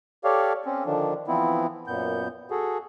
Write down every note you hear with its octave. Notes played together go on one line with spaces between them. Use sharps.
G4 A4 C#5 D5 F5
C4 C#4
D3 D#3 F3 D4
E3 F3 B3 C4 E4
F#2 A#2 B3 G6
F#4 G#4 A4